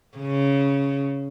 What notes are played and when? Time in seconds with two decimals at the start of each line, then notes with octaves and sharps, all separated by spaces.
0.18 C#3